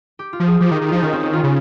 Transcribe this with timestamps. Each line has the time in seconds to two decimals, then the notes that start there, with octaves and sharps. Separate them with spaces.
0.19 G4
0.33 F4
0.40 F3
0.47 G#4
0.61 F3 G4
0.71 D#3
0.74 D#4
0.81 D#3
0.88 F3 F4
0.97 D#4
1.02 D#3 C#4
1.13 C4
1.23 C#4
1.33 F4
1.44 C#3